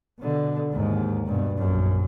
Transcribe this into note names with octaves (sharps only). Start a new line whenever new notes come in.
B2 D3
D#2 G#2
G2 B2
A#1 F#2